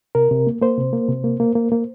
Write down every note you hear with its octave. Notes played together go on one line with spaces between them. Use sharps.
C3 A#4
C3
A#3
A#3 C5
C3
A#3
C3
A#3
A#3
A#3
A#3